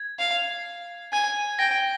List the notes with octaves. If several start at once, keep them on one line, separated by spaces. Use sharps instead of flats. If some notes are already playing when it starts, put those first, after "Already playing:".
Already playing: G#6
F5
G#5 G#6
G5 A#6